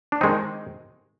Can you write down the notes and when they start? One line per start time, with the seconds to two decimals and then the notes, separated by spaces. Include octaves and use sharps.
0.12 D4
0.21 D#3 G#3 C4 D#4